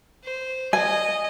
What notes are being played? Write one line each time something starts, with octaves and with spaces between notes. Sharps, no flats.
C5
D#5 G#5